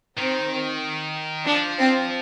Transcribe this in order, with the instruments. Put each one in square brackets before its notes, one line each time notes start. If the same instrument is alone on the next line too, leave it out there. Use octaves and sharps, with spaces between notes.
[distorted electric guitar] D#3 [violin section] C4
[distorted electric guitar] F3 [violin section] D4
[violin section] C4